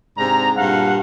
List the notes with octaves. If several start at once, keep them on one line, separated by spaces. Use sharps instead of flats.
G#2 C3 D4 A#5
G2 A#2 F5 F#5